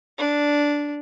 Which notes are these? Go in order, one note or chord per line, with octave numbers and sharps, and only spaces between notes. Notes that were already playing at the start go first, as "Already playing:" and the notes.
D4